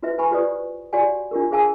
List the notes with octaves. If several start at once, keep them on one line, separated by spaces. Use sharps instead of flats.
E4 F#4 B4 C5 E5
B4 G#5 B5 C#6
F4 G4 B4 C5 D5 D#6
F#4 G4 C#5 D5 F#5 G#5
D4 F4 G4 A#4
G#4 C5 F5 G#5 A5 E6